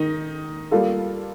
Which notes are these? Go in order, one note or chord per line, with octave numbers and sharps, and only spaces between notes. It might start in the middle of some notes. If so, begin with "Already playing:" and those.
Already playing: D#3 D#4
G3 A#3 F4 A4